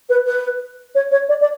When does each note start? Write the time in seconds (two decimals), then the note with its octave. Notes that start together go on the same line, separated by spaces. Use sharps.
0.09 B4
0.26 B4
0.95 C#5
1.11 C#5
1.28 D5
1.40 D5